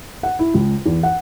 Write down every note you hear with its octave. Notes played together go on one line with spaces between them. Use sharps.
F#5
E4
C#2
E2
F#5